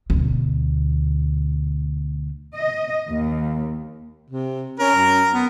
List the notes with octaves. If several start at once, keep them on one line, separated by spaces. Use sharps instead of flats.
D2 B2
D#5
D#2
C3
C#4 A#4
F#2
B3